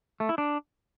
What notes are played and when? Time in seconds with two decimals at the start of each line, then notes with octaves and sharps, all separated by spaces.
0.20 A3
0.29 E4
0.38 D4